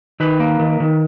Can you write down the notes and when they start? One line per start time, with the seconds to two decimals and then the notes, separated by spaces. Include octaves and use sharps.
0.20 D#3 B4
0.40 A#3
0.60 D#3
0.80 D#3